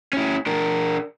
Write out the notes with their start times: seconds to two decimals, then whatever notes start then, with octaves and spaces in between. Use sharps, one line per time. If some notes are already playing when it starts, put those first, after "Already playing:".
0.13 C#4 E4
0.46 D4 A#4